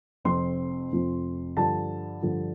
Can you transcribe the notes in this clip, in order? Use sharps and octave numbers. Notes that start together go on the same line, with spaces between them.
F1 F2 F3 C4 C6
F1 F2 F3 C4
G2 D3 F3 A5
G2 D3 F3